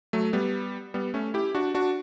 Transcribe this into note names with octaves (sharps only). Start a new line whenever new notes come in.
F#3 A3
G3 B3
G3 B3
A3 C#4
E4 G4
D4 F#4
D4 F#4